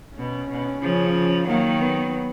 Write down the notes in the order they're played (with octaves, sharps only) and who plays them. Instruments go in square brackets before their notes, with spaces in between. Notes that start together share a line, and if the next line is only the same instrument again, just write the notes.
[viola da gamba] B2 [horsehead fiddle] C#4
[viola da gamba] B2
C#3 F3
[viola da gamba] D#3 F#3 [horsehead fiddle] A#3
[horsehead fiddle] B3